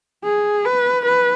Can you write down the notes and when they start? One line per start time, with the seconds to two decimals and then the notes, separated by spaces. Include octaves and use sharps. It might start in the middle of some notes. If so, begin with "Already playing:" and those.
0.24 G#4
0.65 B4
1.05 B4